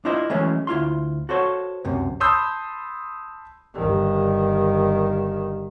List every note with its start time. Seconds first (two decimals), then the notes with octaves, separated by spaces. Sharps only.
0.05 D4 E4 F4 C5 D#5 E5
0.30 E3 F#3 G#3 A3 C#4
0.67 D2 E4 F4 C6
1.29 F#4 A4 C5 C#5
1.84 C#2 F#2 C3
2.20 A5 B5 C6 D#6 E6 G6
3.74 G1 D#3